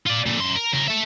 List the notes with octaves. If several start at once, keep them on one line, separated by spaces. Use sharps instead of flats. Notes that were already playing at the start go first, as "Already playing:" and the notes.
F4 D5
A#2 D3
F#2 C6
A#4
C#3 A#4
A4 E5